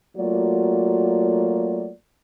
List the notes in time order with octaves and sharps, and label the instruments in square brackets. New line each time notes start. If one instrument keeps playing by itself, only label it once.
[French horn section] F#3 A3 A#3 F4 F#4 D5